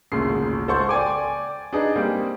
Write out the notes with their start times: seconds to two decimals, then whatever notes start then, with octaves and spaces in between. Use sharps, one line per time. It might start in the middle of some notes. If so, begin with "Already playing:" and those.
0.12 G#1 D2 A#2 C#3 C7
0.68 C#2 A4 C5 F#5 C6 C#6
0.89 D5 G5 G#5 D6
1.73 D4 D#4 G#4 B4
1.96 G3 A#3 C4